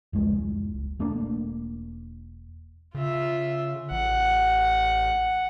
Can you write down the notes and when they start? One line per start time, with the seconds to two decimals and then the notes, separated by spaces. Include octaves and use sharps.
0.13 F1 C#2 G#3
0.99 E1 A3 A#3 D4
2.95 C#3 F4 E5
3.91 A1 F#5